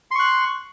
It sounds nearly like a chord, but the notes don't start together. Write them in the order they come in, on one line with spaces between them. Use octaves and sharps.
C6 C#6 F#6